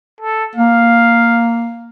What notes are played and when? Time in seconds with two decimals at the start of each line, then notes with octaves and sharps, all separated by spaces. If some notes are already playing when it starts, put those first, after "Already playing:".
0.21 A4
0.56 A#3 F5